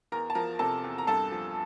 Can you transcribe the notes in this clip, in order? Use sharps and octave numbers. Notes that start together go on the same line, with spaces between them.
E2 A#4 A#5
A5
F3 A#4 A#5
C3 A4 A5
E2
A#5
G2 A4 A5
F3